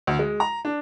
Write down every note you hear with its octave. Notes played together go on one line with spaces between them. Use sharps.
D2
G#3
A#5
D4